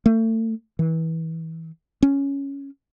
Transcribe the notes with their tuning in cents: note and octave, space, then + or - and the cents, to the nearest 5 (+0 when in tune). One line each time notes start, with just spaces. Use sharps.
A3 +35
E3 -25
C#4 +5